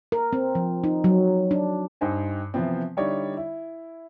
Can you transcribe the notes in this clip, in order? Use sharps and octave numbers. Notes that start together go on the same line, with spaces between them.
A#4
C4
F3
D#4
F#3
D4
G2 D#4 C5 G#5
C3 E3 F3 B3 C4
D3 G3 D#4 E4 C#5 D5
E4